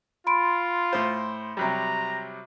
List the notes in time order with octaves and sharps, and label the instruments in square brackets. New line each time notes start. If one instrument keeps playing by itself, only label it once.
[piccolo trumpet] F4 [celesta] B5 C6 D7
[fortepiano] A2 C5
[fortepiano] C3 F#3 G3 [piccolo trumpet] A#5